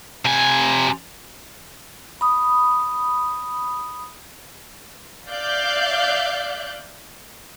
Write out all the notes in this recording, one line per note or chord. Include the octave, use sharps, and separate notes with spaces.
C3 G#5
B5 D#6
D5 E5 F5 F#6 G6